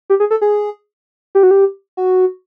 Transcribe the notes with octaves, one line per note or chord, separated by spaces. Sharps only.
G4
G#4
A4
G#4
G4
F#4
G4
F#4